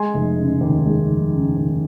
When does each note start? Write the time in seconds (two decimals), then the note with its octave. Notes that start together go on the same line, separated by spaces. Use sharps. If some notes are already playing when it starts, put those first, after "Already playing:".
Already playing: G#3 G#5 C6
0.14 F1
0.38 C#3
0.61 D#2
0.85 G#3
1.09 F1
1.32 C#3
1.57 D#2